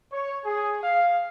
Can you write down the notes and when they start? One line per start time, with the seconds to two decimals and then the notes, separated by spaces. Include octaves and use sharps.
0.12 C#5
0.45 G#4
0.83 F5